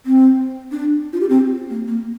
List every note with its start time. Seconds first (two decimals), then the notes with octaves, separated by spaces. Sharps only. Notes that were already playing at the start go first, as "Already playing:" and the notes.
0.06 C4
0.72 D4
1.13 F4
1.21 G4
1.29 C4
1.70 A#3
1.87 A#3